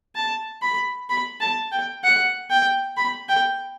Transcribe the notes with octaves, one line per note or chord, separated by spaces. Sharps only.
A5
B5
B5
A5
G5
F#5
G5
B5
G5